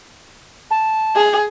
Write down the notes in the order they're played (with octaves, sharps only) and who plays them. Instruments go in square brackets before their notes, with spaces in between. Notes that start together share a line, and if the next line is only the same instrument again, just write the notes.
[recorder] A5
[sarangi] G#4